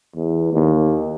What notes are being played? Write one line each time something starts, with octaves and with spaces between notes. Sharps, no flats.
E2
D#2